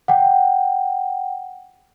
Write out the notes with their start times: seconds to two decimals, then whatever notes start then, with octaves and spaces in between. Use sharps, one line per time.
0.08 F#5 G5